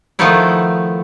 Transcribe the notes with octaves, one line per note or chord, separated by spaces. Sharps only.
D#3 F3 A3 B3 D#4 E4